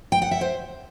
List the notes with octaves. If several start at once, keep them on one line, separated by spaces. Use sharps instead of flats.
G5
F#5
E5
C5